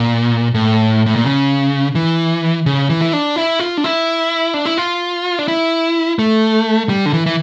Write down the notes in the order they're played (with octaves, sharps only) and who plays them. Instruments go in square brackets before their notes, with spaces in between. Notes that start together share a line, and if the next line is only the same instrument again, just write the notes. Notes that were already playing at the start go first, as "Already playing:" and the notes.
Already playing: [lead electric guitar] A#2
A2
A2
A#2
C#3
E3
C#3
E3
E4
D4
E4
F4
D4
E4
D4
E4
F4
D4
E4
A3
G3
D3
E3
E3